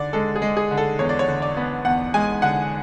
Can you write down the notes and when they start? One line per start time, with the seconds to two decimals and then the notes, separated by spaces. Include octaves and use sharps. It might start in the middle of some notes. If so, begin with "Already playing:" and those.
Already playing: D3 D5
0.13 G#3 A4
0.36 G#4
0.42 G#3
0.57 G#4
0.71 D3
0.77 A4
0.99 E2 C#5
1.09 D5
1.19 C#5
1.28 D3
1.42 D5
1.57 B3
1.85 E2 F#5
2.14 G#3 G#5
2.42 D3 F#5